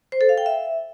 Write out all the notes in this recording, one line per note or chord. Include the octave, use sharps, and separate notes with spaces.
C5
A4
F5
G5
E5